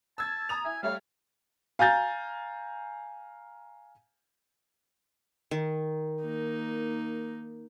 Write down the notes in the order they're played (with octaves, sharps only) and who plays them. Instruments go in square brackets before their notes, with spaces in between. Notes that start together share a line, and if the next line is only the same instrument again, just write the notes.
[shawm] A5 [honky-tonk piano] E6 G#6
[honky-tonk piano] A#5 D#6 F7
[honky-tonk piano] E4 [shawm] G#5
[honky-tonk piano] G3 A3 C#5 [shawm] F5
[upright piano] F5 G#5 A#5 G6 A6
[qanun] D#3
[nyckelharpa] A#3 D#4